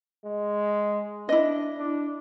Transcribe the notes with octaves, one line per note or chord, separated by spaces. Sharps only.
G#3
D4 E4 D#5
D4